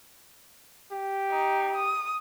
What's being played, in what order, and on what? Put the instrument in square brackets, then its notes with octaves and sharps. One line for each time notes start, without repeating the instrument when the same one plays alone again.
[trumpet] G4
[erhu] D#4
D#6